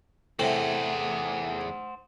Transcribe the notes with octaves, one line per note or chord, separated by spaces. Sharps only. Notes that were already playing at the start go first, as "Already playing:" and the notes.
E2 A2 C3 G#4 C5 F#5